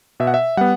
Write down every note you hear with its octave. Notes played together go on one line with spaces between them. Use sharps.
B2 E5
F#5
E5
G3 B3 F#5